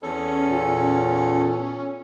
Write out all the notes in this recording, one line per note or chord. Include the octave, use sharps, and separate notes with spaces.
E2 C#4 A4
A#2